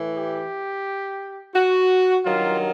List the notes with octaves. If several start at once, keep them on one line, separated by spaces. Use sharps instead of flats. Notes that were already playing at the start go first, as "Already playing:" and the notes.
Already playing: A2 E3
G4
F#4
G2 D#3 F#3 F4